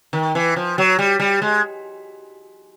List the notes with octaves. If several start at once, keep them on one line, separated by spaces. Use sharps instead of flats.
D#3
E3
F3
F#3
G3
G3
G#3